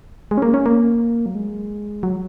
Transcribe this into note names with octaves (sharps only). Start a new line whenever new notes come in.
G#3
C#4
A#3
C#4
A#3
F#3
G#3
F#3